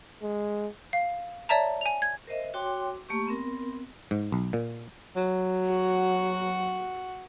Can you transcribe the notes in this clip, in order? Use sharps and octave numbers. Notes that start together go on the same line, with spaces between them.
G#3
F5
C#5 D5 E5 A5 A#5
G#5 F7
G#6
A#4 C5 D#5 E5
F#4 C#5 G5 C6 D6
A3 A#3 G4 C#6
B3 C4 A#4
G#2
B1
A#2
F#3
F#4 F#5